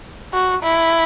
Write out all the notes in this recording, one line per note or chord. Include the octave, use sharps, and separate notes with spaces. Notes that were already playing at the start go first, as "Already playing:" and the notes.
F#4
E4